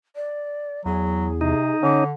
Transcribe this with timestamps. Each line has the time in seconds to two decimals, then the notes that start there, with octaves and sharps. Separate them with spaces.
0.15 D5
0.86 E2 F#3 G#4
1.41 C3 D#4
1.83 D3 C#4 D6